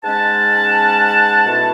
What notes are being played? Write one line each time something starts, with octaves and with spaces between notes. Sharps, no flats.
G#2 G#3 C#4 F#5 A5
B2 A3 E4